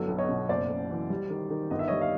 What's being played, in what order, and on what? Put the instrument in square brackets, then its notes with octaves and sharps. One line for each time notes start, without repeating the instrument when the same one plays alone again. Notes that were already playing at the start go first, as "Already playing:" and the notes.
Already playing: [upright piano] G1 F#3 A4
B1
C#5 D#5
B2
F#1 C5 D5
F#1
E3
G3
D#3
D#3
G1 D#5
E5
G3 C#5 D#5
D#5 F5